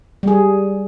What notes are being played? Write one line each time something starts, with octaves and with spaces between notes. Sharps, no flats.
G3 G#4